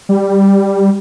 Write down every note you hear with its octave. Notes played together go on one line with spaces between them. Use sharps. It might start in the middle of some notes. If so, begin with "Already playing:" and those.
G3